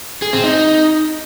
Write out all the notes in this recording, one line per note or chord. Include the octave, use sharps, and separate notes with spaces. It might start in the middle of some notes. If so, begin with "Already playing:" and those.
G#4
C4
D#4